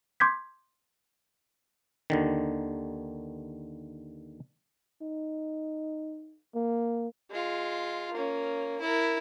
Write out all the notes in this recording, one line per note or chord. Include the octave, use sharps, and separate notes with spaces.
C6 D6 G6 G#6 B6
D#2 D3 D#3
D#4
A#3
G#3 F4
A#3 C#4
E4 A#4